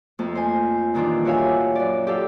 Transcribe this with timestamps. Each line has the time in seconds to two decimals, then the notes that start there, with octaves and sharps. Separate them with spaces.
0.19 F2 A3 A#3
0.35 C5 G#5
0.94 G2 A#2 D#3 E3 D4 F4
1.25 F#4 G4 C#5 E5 F5 G#5
1.75 F#2 D5
2.07 G4 A4 F5